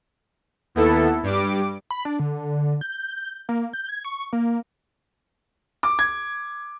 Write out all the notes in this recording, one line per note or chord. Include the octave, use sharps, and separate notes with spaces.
D#2 B3 E4 A4
G2 G3 D6
B5
D4
D3
G6
A#3
G6
G#6
C#6
A#3
D6
G#6